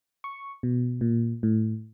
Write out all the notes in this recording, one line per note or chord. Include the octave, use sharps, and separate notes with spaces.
C#6
B2
A#2
A2